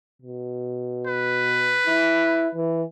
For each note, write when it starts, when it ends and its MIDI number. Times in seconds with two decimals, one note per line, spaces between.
0.22 1.80 47
1.07 2.57 71
1.87 2.48 64
2.55 2.83 52